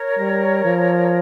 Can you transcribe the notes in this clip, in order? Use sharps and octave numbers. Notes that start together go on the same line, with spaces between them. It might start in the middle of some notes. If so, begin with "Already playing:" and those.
Already playing: A#4 C#5
G3
F3